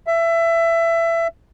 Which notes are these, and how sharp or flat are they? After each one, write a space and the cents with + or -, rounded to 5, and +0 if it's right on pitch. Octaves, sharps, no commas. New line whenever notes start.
E5 +20